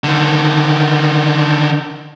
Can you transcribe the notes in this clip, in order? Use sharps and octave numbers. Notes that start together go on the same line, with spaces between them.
D3 D#3